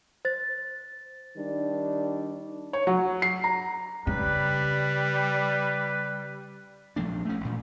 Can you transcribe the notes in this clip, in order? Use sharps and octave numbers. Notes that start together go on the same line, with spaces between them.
C5 A6
D#3 G3 D4
C#5
F#3
C7
A#5
C#3 G3 B4
A#1 F3 A3 D4
A3 C#4
A1 A#2